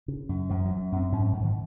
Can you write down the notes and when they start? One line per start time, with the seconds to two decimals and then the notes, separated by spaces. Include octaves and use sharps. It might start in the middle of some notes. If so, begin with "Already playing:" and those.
0.08 C#3
0.29 F#2
0.49 F#2 F3
0.65 F#3
0.71 F#2
0.92 F#2 C4
1.12 G#2 C#4
1.33 G#2
1.44 D#3